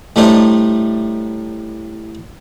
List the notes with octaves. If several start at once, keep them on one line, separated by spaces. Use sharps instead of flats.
A2 G3 A3 D4 D#4 C5